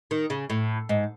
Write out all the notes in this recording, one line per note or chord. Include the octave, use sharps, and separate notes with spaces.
D#3
C#3
A2
G#2